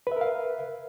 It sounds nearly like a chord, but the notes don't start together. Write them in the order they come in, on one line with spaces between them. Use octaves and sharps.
B4 E5 A#4 F5